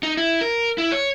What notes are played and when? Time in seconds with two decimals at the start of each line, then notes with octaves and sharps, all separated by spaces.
0.03 D#4
0.17 E4
0.41 A#4
0.78 E4
0.92 C#5